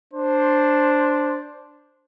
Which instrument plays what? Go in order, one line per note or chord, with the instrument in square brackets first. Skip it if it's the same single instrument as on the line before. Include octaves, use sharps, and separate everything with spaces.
[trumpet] D4 [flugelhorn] C5